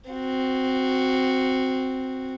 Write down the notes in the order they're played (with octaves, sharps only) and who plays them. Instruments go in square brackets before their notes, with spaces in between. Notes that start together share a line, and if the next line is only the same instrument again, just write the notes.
[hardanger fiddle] C4 F#4